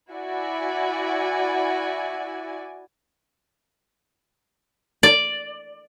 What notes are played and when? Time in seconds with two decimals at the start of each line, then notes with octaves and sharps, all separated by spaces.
0.12 E4 F#4 D5 G#5
5.03 D5